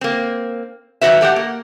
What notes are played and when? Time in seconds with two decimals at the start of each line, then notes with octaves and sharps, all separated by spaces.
0.01 A#3 C4
1.01 G#2 D#3 F#3 F#4 B4 E5
1.21 A3 G4 C#5 F#5
1.36 A#3